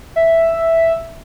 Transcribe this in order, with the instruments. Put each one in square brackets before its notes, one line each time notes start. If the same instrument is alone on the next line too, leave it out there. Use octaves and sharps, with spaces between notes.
[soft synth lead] E5